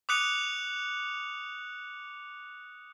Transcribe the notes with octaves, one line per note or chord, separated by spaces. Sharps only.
D6 D#6 F#6 C#7 F7